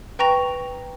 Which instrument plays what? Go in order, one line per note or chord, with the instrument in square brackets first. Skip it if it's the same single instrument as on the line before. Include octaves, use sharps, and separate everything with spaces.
[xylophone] B4 G5 A#5 C#6 A#6 F7